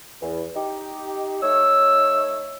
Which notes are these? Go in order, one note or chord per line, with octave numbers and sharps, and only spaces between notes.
E2
D#4 G4
A3 D#4 C#5 E6